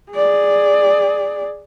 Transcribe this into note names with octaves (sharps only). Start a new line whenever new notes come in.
G#4 D5